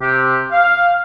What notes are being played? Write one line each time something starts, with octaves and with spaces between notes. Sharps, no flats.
C3 G4
F5